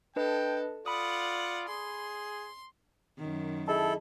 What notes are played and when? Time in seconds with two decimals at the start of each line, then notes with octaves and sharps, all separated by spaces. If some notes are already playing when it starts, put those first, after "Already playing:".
0.16 D4 A4 B4 D#5 G5
0.86 F4 D5 F#5 B5 D#6
1.68 G#4 C6
3.18 F#2 D#3
3.68 E4 G#4 A4 D#5 A5